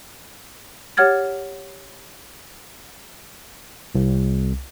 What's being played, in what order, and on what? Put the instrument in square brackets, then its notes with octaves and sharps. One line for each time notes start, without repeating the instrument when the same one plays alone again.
[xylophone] G4 C#5 F#5 F6 G#6 A6
[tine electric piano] C2